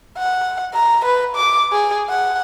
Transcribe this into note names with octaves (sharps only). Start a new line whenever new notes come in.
F#5
A#5
B4
D6
G#4
F#5